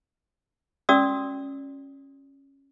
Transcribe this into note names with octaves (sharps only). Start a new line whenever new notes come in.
C#4 F#4 D5 D#6 E6